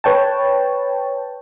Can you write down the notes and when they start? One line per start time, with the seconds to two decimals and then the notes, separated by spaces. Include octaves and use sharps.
0.04 B4 C#5 G5 A5